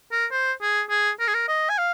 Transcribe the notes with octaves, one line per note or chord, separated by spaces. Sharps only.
A#4
C5
G#4
G#4
A#4
G#4
A#4
D#5
G#5
F5